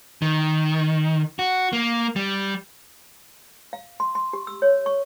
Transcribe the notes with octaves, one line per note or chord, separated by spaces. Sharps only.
D#3
F#4
A#3
G3
F5
C6
C6
G4
E6
C#5
C#6